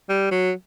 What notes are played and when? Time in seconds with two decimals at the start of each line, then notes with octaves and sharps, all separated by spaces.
0.10 G3
0.32 F#3